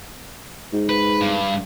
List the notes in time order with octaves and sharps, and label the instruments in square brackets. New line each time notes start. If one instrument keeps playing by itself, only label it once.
[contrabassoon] G#2
[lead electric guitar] B4
G2